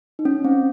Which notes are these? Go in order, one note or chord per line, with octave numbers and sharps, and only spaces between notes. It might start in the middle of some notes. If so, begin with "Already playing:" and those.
D#4
C#4
C4